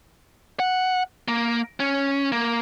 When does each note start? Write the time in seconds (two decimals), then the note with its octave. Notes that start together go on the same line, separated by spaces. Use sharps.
0.60 F#5
1.28 A#3
1.80 C#4
2.32 A#3